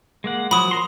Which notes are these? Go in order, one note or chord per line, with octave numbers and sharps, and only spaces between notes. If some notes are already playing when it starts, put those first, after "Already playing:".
G#3 A#3 F#5
F3 F#3 B5 D#6
A#4 A#5 C6